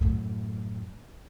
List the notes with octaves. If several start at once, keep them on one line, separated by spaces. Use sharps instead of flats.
F#2 A2